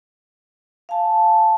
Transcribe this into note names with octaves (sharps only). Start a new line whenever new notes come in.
F5 G#5 A5